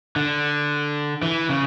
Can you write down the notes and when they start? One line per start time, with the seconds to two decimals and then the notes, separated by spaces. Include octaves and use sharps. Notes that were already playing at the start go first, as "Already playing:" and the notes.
0.16 D3
1.22 E3
1.49 C#3